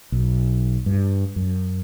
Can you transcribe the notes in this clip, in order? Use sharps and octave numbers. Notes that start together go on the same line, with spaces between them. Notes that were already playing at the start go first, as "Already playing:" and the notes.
B1
G2
F#2